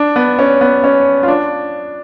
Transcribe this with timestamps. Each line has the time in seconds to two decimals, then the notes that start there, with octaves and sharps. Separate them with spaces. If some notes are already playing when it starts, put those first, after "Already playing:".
Already playing: D4
0.16 B3
0.39 C#4
0.61 B3
0.84 C#4
1.23 F4
1.28 D4